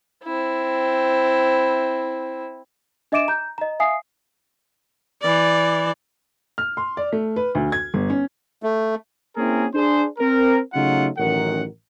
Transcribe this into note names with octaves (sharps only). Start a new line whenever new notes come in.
C4 E4
D4 D#5 E5 D6 D7 E7
A#5 G6
D#5 A#5
E5 F5 G#5 D#6 C7
E3 D5
F6
C6
D5
A3
B4
D2
G#6
G1
C#4
A3
A#3 C4 C#4 E4 G#4 A#4
D4 G#4 C5
C4 A#4
C#3 F#3 A3 D#4 F4 F#5
A1 F#2 D#3 A#4 F#5